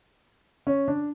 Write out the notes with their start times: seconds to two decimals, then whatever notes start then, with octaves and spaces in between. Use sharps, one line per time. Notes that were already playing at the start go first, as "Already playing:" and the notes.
0.67 C#4
0.88 D4